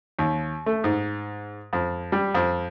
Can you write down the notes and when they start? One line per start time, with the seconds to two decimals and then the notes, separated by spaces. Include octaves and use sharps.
0.19 D#2
0.66 A3
0.84 G#2
1.73 F2
2.12 G3
2.34 F2